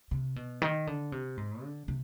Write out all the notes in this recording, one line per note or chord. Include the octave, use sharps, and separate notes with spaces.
C3
B2
D#3
D3
C3
G#2
D3
C3